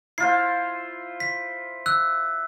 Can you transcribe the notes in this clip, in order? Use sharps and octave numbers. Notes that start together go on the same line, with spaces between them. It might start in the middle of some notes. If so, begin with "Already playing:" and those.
E4 F4 C5 C7
B6
E6 F#6